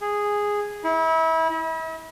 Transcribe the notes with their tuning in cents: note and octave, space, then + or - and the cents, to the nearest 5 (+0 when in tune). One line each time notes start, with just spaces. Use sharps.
G#4 -10
E4 -30
E5 -45